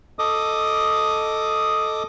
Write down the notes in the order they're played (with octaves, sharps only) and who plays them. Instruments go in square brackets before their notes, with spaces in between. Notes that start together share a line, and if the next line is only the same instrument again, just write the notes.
[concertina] A4 D#5 D6 D#6